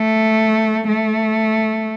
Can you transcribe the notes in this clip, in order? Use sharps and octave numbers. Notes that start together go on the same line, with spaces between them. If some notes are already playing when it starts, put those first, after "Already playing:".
Already playing: A3
A3